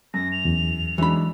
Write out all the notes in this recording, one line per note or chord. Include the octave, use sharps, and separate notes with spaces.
F#2 A#6
F7
E2
E3 F#3 G#3 D4 B5